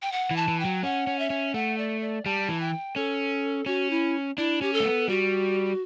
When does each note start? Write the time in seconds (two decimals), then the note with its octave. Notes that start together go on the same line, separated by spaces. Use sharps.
0.02 G5
0.12 F#5
0.31 E3
0.36 A5
0.48 E3
0.60 G5
0.65 F#3
0.83 C#4 F#5
1.07 C#4
1.19 E5
1.30 C#4
1.54 A3 F#5
1.78 D5
2.01 D5
2.25 G3 A5
2.49 E3
2.60 G5
2.96 C#4 A4
3.66 C#4 F#4
3.91 E4
4.38 D4 E4
4.61 C#4 G4
4.73 A4
4.80 A3
4.85 B3
5.08 G3 F#4